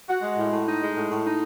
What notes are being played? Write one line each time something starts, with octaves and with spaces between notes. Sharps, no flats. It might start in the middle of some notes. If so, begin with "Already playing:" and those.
F#4
G#3
A2
A2
D#4
G#3
A2
A2
D#4